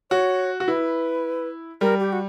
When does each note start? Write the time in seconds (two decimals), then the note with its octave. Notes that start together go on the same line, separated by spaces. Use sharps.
0.11 F#4 C#5
0.60 F#4
0.68 E4 B4
1.81 G3 A#4
2.00 G4
2.13 F#4